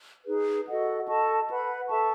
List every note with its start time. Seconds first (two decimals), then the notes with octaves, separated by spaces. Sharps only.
0.26 D#4 G#4 B4
0.67 F#4 A4 D#5 F#5
1.07 A4 D#5 A5 C#6
1.48 B4 F#5 B5
1.88 A4 E5 A5 C#6